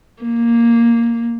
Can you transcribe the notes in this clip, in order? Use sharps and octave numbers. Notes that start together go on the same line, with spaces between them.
A#3